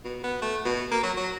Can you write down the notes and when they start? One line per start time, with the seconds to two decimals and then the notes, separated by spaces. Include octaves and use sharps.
0.05 B2
0.24 B3
0.42 A3
0.65 B2
0.92 A#3
1.03 F#3
1.17 F#3